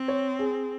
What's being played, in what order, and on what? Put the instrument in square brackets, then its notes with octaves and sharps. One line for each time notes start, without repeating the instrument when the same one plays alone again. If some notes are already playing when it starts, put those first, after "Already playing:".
Already playing: [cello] C4
[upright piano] C#5
G#4